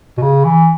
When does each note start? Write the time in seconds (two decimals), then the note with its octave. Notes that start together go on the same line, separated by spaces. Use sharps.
0.17 B2
0.22 C#3
0.44 E3